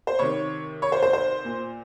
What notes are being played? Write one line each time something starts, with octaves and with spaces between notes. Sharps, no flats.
C5
C3 D#3 C#5
C#5
C5
C5
C5
A#2